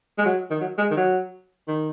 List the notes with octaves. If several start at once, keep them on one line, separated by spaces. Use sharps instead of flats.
G#3
F#3
D#3
F#3
G#3
D#3
F#3
D#3